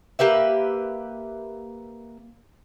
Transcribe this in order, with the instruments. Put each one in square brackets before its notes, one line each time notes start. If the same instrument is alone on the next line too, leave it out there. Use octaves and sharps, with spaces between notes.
[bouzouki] A#3 G4 B4 E5